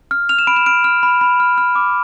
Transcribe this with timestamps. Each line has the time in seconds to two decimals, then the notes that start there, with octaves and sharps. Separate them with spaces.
0.11 F6
0.29 F6 F7
0.39 E7
0.47 B5 D7
0.56 E7
0.66 F6 D7
0.84 F6
1.03 B5
1.21 B5
1.40 F6
1.58 F6
1.76 D6